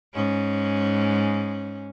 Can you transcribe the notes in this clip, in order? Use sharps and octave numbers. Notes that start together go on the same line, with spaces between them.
G#2 C#4